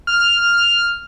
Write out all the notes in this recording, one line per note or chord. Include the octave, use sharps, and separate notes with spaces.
F6